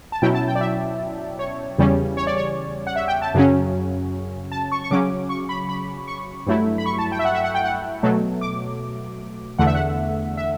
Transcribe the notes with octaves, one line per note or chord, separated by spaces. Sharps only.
A5
B2 F#3 C#4 E4 G5
A5
G5
D5
E5
C#5
E2 C#3 G3 C#4
C#5
D5
C#5
F#5
E5
G5
A5
F#2 C#3 F#3 C#4
A5
C#6
C#6
C#3 F#3 C#4 D6
C#6
B5
B5
C#6
G2 F#3 A3 E4
B5
C#6
A5
G5
E5
F#5
E5
F#5
G5
F#5
B2 F#3 A3
D6
E2 D3 A3 F#5
E5
F#5
E5